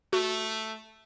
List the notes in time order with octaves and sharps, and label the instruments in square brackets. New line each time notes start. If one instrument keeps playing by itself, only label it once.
[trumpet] A3 [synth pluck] F#4